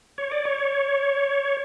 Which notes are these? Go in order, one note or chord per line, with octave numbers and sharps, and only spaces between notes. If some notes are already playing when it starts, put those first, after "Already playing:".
C#5
D5
C#5